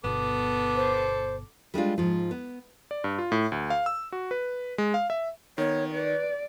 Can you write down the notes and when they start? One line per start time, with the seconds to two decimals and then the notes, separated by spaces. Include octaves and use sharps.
0.04 G1 B2 B3 A4 D6
0.76 C5
1.74 G3 G#3 D4 F4
1.98 G#2 F3
2.31 B3
2.91 D5
3.04 G2
3.19 F4
3.32 A2
3.52 D2
3.70 F5
3.86 E6
4.12 F#4
4.31 B4
4.78 G#3
4.94 F5
5.10 E5
5.58 D#3 B3 C#5
5.94 B4 D5